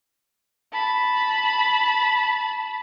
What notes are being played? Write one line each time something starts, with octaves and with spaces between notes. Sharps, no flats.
A5 B5